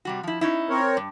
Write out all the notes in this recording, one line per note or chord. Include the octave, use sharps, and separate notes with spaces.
C3 G3 F#4
F3 E4
C#4 D#4 E4
C4 A#4 C#5
G2